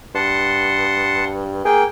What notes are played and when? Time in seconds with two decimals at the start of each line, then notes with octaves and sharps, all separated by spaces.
0.15 G2 F#5 A5 C6
1.65 A#3 G#4 G5